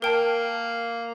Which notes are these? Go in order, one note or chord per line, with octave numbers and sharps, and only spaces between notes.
A#3 A#4 G5 A5